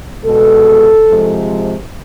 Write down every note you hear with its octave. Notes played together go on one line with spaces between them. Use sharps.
E2 B2 G#3 A4
C3 F3 G#3